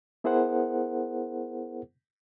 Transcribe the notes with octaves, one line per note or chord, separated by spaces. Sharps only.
B3 E4 G#4 A#4 C5 F#5